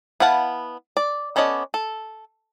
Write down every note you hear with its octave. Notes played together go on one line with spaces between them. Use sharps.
B3 E4 F5 F#5 A5
D5
B3 C#4 A4 D5 D#5
A4